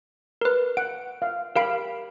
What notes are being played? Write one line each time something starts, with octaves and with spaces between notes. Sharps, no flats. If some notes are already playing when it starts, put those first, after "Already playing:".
A#4 B4
F#5 D7
E5 F5
G4 A#4 F5 B5 C7 D7